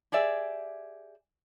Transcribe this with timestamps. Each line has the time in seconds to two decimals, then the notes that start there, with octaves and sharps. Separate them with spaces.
0.12 G4 G#4 D5 E5